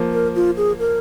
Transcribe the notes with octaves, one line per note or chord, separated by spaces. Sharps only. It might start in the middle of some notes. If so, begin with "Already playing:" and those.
Already playing: F3 A#3
A#4
F4
G#4
A#4